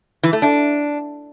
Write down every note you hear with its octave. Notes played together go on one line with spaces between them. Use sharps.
E3
A3
D4